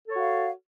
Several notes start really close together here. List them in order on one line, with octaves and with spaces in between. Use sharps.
A4 C#5 F#4 F5